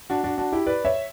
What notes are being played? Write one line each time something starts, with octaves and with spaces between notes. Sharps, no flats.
D4 F#4
D4 F#4
D4 F#4
E4 G4
B4 D5
C#5 E5